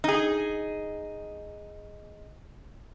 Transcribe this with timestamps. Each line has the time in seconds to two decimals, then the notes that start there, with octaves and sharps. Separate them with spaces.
0.04 D#4 G#4